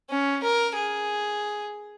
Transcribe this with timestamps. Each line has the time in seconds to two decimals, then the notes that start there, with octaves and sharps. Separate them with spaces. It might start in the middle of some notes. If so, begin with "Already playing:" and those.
0.10 C#4
0.43 A#4
0.76 G#4